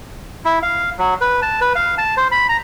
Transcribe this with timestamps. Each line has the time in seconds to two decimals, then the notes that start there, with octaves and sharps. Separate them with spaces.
0.45 E4
0.63 F5
0.98 F#3
1.21 B4
1.42 A5
1.61 B4
1.76 F5
1.98 A5
2.17 C5
2.31 B5
2.49 A#5